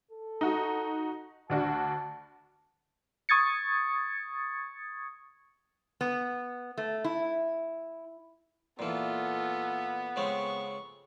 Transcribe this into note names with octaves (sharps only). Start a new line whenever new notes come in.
A4
D#4 F#4
D2 D4 F#4 A5
C#6 D#6 G#6 A6 C#7
B3
A3
E4
A#2 E3 B3 F4 A4
C#3 G#3 C4 C#6